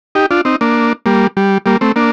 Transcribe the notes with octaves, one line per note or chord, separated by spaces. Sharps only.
D#4 G4
D4 F4
C4 D#4
A#3 D4
G3 A#3
G3
G3 A#3
A3 C4
A#3 D4